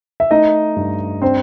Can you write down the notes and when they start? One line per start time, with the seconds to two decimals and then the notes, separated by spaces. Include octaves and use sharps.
0.20 E5
0.31 A3 D#4 D#5
0.76 G2
1.22 C4 D4 C5